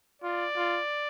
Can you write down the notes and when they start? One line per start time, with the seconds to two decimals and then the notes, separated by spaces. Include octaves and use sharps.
0.22 F4 D5
0.56 F4